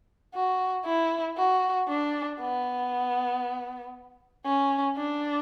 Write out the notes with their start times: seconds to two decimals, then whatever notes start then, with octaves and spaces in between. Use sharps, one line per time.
0.35 F#4
0.85 E4
1.37 F#4
1.89 D4
2.40 B3
4.46 C#4
4.97 D4